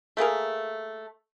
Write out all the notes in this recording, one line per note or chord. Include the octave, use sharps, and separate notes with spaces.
A3 A#3 G#4 A#4